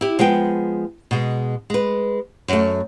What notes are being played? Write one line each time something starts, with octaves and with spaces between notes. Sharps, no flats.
E4 G4
F3 G#3 B3 G5
B2 G#3
G#3 B4
F#2 A3